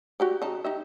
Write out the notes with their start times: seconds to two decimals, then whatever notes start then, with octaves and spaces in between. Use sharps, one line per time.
0.20 F#4 G4 D5
0.42 C#3 D#4 A5
0.64 D#4 G4 E5